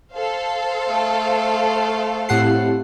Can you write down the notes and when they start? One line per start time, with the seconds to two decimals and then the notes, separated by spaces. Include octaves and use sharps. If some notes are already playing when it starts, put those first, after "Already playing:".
0.15 A4 C5 F5
0.88 A3
2.29 A2 C4 E4 G4 F#5 C7